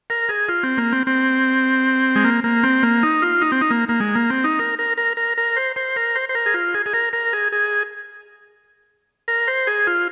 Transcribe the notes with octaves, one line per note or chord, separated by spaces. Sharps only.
A#4
G#4
F4
C4
A#3
C4
C4
G#3
A#3
A#3
C4
A#3
D#4
F4
D#4
C4
D#4
A#3
A#3
G#3
A#3
C4
D#4
A#4
A#4
A#4
A#4
A#4
C5
C5
A#4
C5
C5
A#4
G#4
F4
G#4
G#4
A#4
A#4
G#4
G#4
A#4
C5
G#4
F4